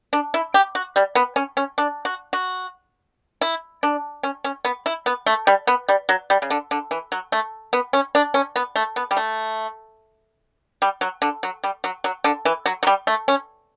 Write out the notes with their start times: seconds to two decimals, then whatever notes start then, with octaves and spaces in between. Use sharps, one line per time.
0.13 D4
0.34 E4
0.54 G4
0.75 F#4
0.96 G3
1.15 B3
1.36 C#4
1.57 C#4
1.78 D4
2.05 F#4
2.33 F#4
3.41 E4
3.83 D4
4.23 C#4
4.44 C#4
4.65 B3
4.86 E4
5.06 B3
5.27 A3
5.47 G3
5.67 B3
5.89 G3
6.09 F#3
6.30 G3
6.42 C#3
6.50 D3
6.71 D3
6.91 E3
7.12 F#3
7.32 A3
7.73 B3
7.93 C#4
8.15 D4
8.34 C#4
8.56 B3
8.76 A3
8.96 B3
9.11 G3
9.17 A3
10.82 G3
11.01 F#3
11.22 D3
11.43 F#3
11.64 G3
11.84 F#3
12.04 F#3
12.24 D3
12.45 E3
12.66 F#3
12.83 F#3
12.87 G3
13.07 A3
13.28 C#4